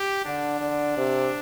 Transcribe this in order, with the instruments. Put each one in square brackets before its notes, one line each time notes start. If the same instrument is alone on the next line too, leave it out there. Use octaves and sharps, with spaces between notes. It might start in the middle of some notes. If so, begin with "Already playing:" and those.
Already playing: [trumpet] G4
[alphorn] D3 [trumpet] D4
[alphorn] D3
C3